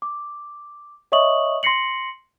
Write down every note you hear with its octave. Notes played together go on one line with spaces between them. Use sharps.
D6
C#5 D#5 E5 C#6 D#6 F#7
C6 A#6 C7 C#7 F#7